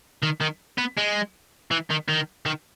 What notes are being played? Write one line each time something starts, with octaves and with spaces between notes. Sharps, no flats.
D#3
D#3
B3
G#3
E3
D#3
D#3
D#3